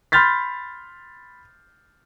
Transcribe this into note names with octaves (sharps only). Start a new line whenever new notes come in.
B5 C6 F6 G6 A6 B6